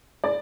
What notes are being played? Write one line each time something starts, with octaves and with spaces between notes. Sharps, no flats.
D5